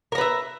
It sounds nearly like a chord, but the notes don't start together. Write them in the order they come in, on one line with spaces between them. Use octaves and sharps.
A#4 A#5 B4 E5